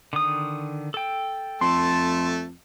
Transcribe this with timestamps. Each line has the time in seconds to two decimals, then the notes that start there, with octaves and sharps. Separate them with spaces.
0.13 D3 D#3 D#6
0.94 A4 G5
1.61 F2 A3 A5 C6